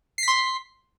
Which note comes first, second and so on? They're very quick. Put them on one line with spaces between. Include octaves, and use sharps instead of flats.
C7 B6 C6